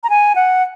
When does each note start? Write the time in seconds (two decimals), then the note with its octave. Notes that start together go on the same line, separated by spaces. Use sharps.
0.04 A#5
0.10 G#5
0.35 F#5